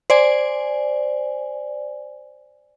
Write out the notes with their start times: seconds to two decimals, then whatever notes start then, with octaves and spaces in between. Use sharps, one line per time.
0.10 C5 D5 G#5